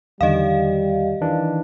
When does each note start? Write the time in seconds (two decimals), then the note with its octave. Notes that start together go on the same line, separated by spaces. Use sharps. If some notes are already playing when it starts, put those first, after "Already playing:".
0.21 E2 D3 D#3 G3 D#5 F5
1.21 D#3 E3 D4